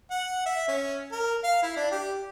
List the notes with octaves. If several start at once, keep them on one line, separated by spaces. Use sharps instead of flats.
F#5
E5
C#4
A#4
F5
E4
D4
G4